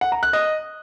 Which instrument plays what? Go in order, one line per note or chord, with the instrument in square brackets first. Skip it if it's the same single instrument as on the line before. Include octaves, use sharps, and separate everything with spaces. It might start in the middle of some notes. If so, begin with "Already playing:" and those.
[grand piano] F#5
A#5
F#6
D#5